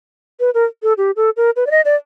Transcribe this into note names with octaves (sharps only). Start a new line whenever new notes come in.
B4
A#4
A4
G4
A4
A#4
B4
D5
D#5
D5